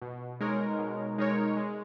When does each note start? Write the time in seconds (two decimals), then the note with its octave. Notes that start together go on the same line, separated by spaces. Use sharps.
0.02 B2
0.41 G#3 D#4 A#4 C#5
0.79 B2
1.18 G#3 D#4 A#4 C#5
1.57 G#3